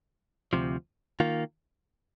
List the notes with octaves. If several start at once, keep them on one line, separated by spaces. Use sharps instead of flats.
D2 C3 F3
D#3 A#3 F4